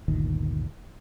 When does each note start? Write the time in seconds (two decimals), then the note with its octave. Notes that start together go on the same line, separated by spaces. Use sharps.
0.08 G1 D2 A#2 D#3